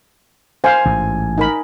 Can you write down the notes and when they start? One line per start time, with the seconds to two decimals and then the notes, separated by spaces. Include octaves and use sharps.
0.64 C5 F5 G#5
0.85 A1 G#2
1.38 D#4 A#4 B5